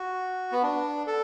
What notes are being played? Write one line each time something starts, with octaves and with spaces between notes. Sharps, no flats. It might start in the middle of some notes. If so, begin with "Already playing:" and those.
Already playing: F#4
B3
D4
A4